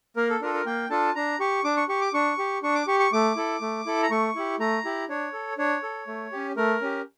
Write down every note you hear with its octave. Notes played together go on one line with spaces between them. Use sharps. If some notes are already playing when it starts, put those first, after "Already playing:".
A#3 A#4
A4
D4 F4 A4 A#4
A#4
A#3 G5
D4 F4 A4 A5
D4 A#5
G4 C#6
D4 D6
C#6
G4 C#6
D6
D4 C#6
G4
D4 C#6
D6
G4 C#6
C#6
A3 D6
E4 A4
A3
E4 A4
A#5
A3 C#6
E4 G4
A3 A#5
E4 G4
D4 C#5
A4
D4 C#5
A4
A3
C#4 G4
A3 A#4
C#4 G4